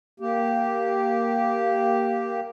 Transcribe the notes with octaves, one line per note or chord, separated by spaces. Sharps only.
A#3 G4